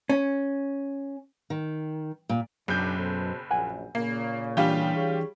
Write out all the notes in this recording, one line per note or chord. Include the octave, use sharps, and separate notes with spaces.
C#4
D#3
A#2
F#1 F#2 B2 D4 G6
B2 A4 C5
A#1 F#2 F#5 G#5
A#2 C#3 A#3
E3 G3 D4 F4 G4
G#4 C#5